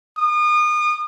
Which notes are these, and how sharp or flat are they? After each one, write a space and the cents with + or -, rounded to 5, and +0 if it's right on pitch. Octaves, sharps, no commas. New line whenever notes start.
D#6 -35